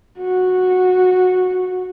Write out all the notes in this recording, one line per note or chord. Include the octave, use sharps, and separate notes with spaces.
F#4